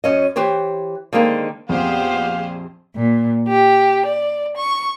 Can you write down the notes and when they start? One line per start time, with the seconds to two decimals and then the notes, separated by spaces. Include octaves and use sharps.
0.04 F#2 C#4 D#5
0.36 E3 G4 C5 C#5
1.13 D3 D#3 G#3 A#3 C4
1.69 A#1 F2 B3 G4 G#4 C5 F5
2.95 A#2
3.48 G4
4.06 D5
4.56 C#6